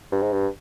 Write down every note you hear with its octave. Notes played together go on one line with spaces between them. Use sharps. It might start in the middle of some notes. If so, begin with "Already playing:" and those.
G2
G#2
G2